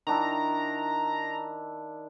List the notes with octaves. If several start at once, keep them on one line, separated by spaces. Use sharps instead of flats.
D#3 D4 E4 A#5